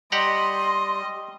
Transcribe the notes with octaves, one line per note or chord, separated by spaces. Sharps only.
G3 G4 D#5 F#5 A#5 C6